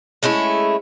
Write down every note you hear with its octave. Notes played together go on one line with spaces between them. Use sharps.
G#3 A3 C#4 E4